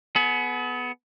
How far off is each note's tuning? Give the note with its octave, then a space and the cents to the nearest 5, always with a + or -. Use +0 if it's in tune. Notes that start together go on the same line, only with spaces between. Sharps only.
B3 +0 G#4 +40